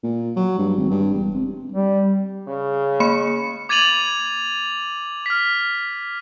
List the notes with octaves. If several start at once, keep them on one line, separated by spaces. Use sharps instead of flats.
A#2
F#3
G2
G#1
G2
E1
C3
G3
C#3
A#3 B5 C#7
D6 G#6 A6 D#7 F7 F#7
F6 B6